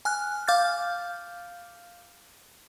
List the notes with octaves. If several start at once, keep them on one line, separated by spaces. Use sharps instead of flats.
G#5 F6 F#6
F5 D6 F6 G6 A6